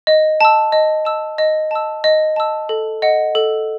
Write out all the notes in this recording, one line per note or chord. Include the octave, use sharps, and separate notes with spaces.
D#5
A5 E6
D#5
A5 E6
D#5
A5 E6
D#5
A5 E6
A4
D#5 F#5
A4